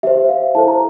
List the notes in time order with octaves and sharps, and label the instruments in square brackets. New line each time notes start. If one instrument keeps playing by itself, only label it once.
[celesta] G4 C5 E5
F5
E4 A4 C5 A5
A#5